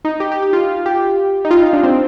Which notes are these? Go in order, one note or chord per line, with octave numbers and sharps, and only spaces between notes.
D#4
G4
G4
G4
F4
G4
D#4
F4
D#4
D4
C4